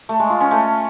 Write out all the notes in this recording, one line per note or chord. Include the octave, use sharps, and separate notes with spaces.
A3
G#3
F4
C#4
A3